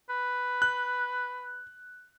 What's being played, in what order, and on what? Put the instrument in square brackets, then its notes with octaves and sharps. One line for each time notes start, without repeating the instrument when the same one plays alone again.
[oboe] B4
[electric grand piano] F#6